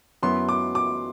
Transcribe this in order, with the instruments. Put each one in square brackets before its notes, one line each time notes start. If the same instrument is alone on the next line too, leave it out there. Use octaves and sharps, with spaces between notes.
[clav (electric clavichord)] F#2 F#3 B3 E4 [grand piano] C6
[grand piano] D6
D6